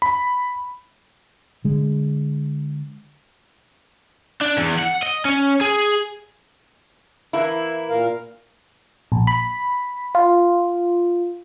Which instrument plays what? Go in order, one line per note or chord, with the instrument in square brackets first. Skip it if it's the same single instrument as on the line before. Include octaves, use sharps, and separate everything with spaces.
[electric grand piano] B5
[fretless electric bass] D3 G#3
[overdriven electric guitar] D4
E2
F#5
D#5
C#4
G#4
[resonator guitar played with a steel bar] E3 A#3 E4
[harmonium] A#2 A#4 F5
[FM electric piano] A#1
B5
F4